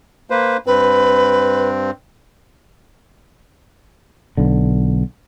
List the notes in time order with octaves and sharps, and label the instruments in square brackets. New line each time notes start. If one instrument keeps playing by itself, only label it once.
[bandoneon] A#3 B4 C5
[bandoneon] G2 C4 [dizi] B4
[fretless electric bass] B1 D3